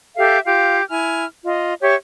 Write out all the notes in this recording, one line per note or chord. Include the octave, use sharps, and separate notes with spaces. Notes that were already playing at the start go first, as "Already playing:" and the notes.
G4 A4 E5 F5
F4 G4 F5
E4 G#5 F6
F4 D#5
G4 C#5 E5